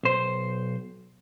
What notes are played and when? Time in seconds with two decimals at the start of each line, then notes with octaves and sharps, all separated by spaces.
0.03 B1 C5